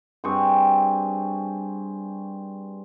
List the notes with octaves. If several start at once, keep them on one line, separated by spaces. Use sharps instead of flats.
G2 C4 G#4 C#6